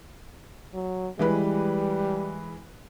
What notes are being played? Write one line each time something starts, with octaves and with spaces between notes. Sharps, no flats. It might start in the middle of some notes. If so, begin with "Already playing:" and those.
F#3
E3 G3 G#3 B4